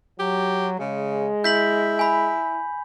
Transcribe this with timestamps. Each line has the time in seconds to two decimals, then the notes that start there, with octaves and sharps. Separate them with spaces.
0.20 F#3 G4
0.79 C#3 G#3
1.44 E4 G6 B6 F#7
1.99 G#5 B5